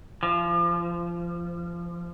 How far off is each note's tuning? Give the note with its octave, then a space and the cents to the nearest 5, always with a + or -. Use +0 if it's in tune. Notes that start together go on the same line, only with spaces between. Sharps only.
F3 -25